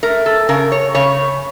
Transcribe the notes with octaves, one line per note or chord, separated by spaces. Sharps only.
A3 A#4
A4
C#3 A#4
C#5
C#3 C#5